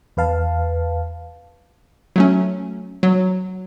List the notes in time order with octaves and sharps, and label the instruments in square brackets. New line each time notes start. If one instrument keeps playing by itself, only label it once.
[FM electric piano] E2 B4 F5 A5
[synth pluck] F#3 A3 C#4
F#3